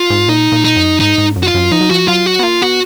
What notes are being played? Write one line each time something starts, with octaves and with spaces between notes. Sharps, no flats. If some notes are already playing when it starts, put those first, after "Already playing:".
Already playing: F4
G#2
A#2 D#4
A#2
D#4
F#2
G#2 D#4
G#2
F#2
F#4
F4
F#2
F3 D#4
F#3
F3 F#4
F#3 F4
F#4
B3
A#3 F4
B3 F#4